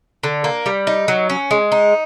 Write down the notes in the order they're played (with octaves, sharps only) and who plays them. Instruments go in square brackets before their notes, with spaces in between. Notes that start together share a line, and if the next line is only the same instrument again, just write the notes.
[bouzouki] D3
A#3
G3
D#4
F#3
C#4
G#3
D#4